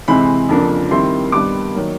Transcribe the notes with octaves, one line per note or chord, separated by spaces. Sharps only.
C3 E3 G#3 C4 B5
F2 C#3 F3 A#3 D4
D#3 G3 C4 E4 C6
G2 D#3 G3 B3 D6
D#3 F#3 A#3